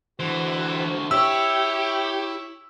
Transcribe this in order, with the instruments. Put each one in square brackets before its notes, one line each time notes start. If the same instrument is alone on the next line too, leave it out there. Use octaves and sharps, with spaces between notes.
[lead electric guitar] D3 C5 [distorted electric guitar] E3 [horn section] F#4
[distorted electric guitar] E4 [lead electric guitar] G4 [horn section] C#5 [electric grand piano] E6